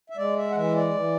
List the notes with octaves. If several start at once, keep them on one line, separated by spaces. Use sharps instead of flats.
E5
G#3 D5
E5
F#5
E3 E5
D5
E3